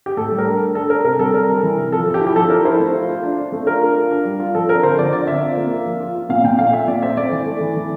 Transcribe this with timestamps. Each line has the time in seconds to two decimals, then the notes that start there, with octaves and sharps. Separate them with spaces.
0.06 G4
0.17 A2 A4
0.32 G3
0.38 A#4
0.46 D4
0.61 D4
0.75 D4 A4
0.90 D4 A#4
1.05 C3 A#4
1.19 G3 A4
1.34 C3 A#4
1.49 G3
1.63 E3
1.77 C3
1.92 F3 A4
2.06 F3
2.14 G4
2.21 E4
2.27 G4
2.36 F3 A4
2.50 E4 A#4
2.65 E4 C5
2.80 A3
2.94 F4
3.09 F4
3.23 D4
3.38 D4
3.52 A3
3.67 F4 A#4
3.82 D4
3.97 F4
4.11 D4
4.25 G3
4.40 F4
4.55 F3 A4
4.69 C4 A#4
4.83 D3 C5
4.99 F3 D5
5.13 D3 D5
5.27 C4 E5
5.43 F4
5.57 A#3
5.71 F4
5.86 F3
6.01 F4
6.15 F4
6.29 A#2 F5
6.44 A#2 G5
6.59 A3 F5
6.73 F4 E5
6.88 A#2 D5
7.02 C4 E5
7.17 A3 D5
7.32 E3
7.46 A3
7.61 E3
7.76 E3